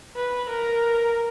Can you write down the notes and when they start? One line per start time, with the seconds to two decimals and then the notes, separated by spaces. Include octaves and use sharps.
0.17 B4
0.50 A#4